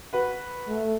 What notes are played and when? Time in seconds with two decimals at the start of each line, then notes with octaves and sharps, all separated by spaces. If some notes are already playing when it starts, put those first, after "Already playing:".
0.13 F#4 B4 F#5
0.68 A3